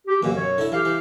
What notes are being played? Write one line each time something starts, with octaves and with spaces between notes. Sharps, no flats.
G4
F#2 B2 D3 E3 A#3
C#5
D3 E4
E3 G4 F5
E3